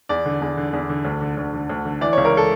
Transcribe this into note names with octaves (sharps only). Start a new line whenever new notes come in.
E2 D5
D3
E2
D3
E2
D3
D2
D3
D2
D3
D2
D3
E3 D5
C#2 C#5
A#4
A4